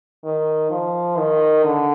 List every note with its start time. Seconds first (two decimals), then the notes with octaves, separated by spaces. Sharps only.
0.24 D#3
0.71 F3
1.17 D#3
1.64 D3